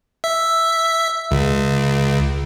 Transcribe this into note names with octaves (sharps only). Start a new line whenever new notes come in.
E5
C#2